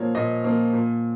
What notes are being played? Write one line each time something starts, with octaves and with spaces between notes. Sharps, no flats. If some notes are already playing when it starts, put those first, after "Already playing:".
Already playing: A#2 F3 A#3 C#5
A#2 D#5
F3 A#3
A#2